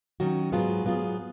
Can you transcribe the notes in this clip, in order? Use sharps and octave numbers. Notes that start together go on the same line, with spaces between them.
D#3 F#3 C#4 F#4
G#2 F#3 B3 F4 G#4
G#2 F#3 B3 F4 G#4